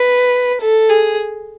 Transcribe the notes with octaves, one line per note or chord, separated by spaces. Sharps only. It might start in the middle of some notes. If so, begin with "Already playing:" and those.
Already playing: B4
A4
G#4